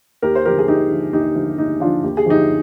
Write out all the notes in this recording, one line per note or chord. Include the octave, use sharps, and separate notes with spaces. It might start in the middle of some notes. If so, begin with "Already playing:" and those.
D#2 G4 A#4
C5
D3 F3 G4 A#4
G#4
D#2 D#4 G4
D3 F3
D#2 D#4 G4
D3 F3
D#2 D#4
D3 F3 D4 F4
D#2 G4
G#4
D3 F3 D#4 G4